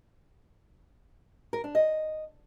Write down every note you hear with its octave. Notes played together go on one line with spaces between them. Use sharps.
A#4
D4
D#5